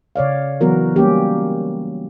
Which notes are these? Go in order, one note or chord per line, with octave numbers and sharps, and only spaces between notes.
C#3 C#5 D5 F5
E3 F#3 B3 F#4 A#4
G3 A#3 C#4 G4